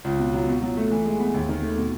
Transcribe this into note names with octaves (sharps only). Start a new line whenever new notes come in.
C#2
B2
F#3
B2
F#3
A3
E3
G#3
B3
D#2
D#3
A3
B2